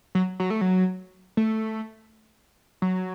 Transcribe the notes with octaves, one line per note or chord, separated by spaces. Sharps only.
F#3
F#3
A3
F#3
A3
F#3